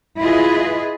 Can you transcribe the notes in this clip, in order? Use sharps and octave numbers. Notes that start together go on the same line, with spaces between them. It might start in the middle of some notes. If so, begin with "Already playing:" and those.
E4 F4 G#4 B4 D#5